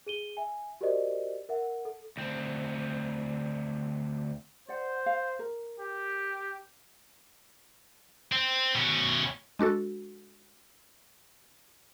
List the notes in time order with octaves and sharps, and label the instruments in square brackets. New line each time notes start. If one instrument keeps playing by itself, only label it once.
[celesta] G#4 D#7 G7
E5 G#5
F#4 G4 A#4 C5 D5 D#5
A#4 E5 F#5
A4
[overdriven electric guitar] D2 C4
[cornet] C5 [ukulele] D5 F#5
[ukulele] F5
A#4
[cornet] G4
[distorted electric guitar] C4
B2 C#4
[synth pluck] G#3 D4 F#4 A4